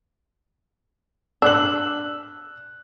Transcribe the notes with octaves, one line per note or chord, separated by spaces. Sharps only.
D4 E6 F#6 F#7